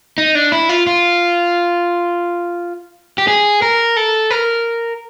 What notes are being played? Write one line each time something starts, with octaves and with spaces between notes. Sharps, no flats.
D#4
D4
E4
F4
F4
G4
G#4
A#4
A4
A#4